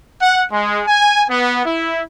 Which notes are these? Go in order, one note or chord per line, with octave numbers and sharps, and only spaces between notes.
F#5
G#3
G#5
B3
E4